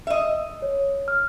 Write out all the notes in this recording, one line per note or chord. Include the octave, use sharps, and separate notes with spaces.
D#5 E5
C#5
F6